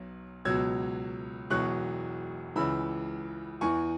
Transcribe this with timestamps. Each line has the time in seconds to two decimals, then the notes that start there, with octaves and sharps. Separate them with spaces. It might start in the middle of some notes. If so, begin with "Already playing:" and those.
Already playing: B1 B2 F#3
0.45 C#2 B2 F#3 E6 G#6
1.50 E1 E2 B2 F#3 C#6 F#6
2.56 C#2 C#3 E3 B5 E6
3.61 E2 E3 G#5 C#6